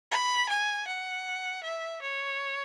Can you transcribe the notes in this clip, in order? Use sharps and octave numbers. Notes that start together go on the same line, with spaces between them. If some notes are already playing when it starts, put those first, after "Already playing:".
B5
G#5
F#5
E5
C#5